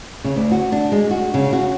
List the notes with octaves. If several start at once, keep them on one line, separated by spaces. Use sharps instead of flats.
C#3
D2
F#4
D4
G#3
F#4
C#3
F#4